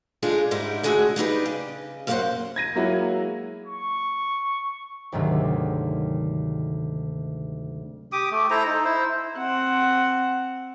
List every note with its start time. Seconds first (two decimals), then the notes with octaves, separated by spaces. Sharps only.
0.22 G#3 D4 D#4 F4 G#4 A4
0.51 G#2 G3 D#4 E4
0.83 D3 G#3 A3 F#4 G#4
1.16 G3 D4 D#4 B4
1.46 C#3
2.07 F#2 A#3 C4 F#4 C5 F#5
2.56 G#6 A#6 D#7
2.76 F#3 G#3 A#3 E4 F#4
3.66 C#6
5.12 D2 G#2 C3 D#3 F#3 A3
8.12 G4 D6 D#6
8.32 A3
8.50 E4 A4 C5 A#5
8.66 D#4
8.84 E4 C5
9.38 C4 F#5